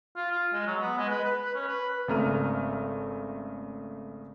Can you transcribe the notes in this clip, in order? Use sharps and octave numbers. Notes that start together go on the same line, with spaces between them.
F4
F4
G#3
F#3
B3
G#3
B4
B4
B4
C#4
B4
G#1 C#3 A3 A#5 F6 D#7